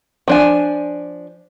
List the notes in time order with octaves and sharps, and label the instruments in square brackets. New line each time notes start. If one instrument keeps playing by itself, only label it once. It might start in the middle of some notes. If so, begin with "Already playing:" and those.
[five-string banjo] F3 D4 G#5